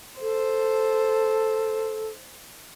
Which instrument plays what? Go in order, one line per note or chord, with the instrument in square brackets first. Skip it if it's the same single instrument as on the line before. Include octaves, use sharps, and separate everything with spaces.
[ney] A4 [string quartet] C5